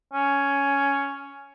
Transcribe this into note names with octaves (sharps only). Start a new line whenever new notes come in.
C#4